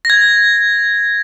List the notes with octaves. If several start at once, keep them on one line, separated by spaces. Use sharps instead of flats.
A#6
G#6